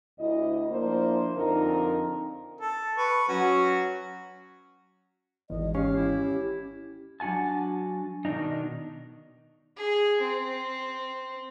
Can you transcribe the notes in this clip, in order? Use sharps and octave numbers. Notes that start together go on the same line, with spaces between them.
D2 E4 D#5
F3 A#3 D4 E4 C5
F2 D3 C4 D#4 F4 A#4
A4
B4 C#6
F#3 C#4 F#4
G#1 E2 D#5
C#4 G4 F5
E4
F#3 D4 F#4 G#5 A5
B2 D#3 A#3 D4 D#4
G#4
C4